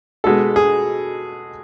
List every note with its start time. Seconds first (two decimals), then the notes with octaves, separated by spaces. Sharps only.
0.24 B2 G#3 B3 A4
0.56 G#4